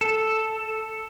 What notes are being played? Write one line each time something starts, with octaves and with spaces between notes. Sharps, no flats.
A4